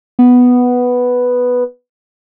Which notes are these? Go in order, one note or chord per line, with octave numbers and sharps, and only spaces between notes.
B3